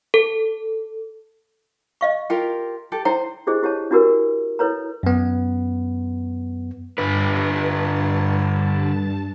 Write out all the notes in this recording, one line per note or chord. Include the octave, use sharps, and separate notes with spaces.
A4
D#5 F5 C#6
F4 G4 A#4 G5
G4 A4
E4 C5 G5 A#5
D4 E4 G4 G#4 C5 D#5
E4 G4 C#5 A5
D4 E4 F#4 G4 A#4 B4
E4 A4 B4 C#5 A#5
F#2 B3
G2 D3 B4 A5